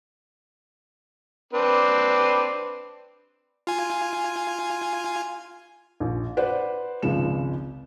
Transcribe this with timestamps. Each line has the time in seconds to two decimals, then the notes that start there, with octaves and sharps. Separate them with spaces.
1.53 C4 D4 B4
3.67 F4 G#5
6.00 A#1
6.37 B4 C5 D5 F#5
7.02 G#1 C#2 F3 G#3 E7